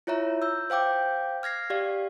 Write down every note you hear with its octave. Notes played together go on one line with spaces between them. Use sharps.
E4 F4 C#5 E5 A#5
E6 G6
C5 F5 G5 D6 G6
F6 G#6 A#6 C7
G4 D5 F5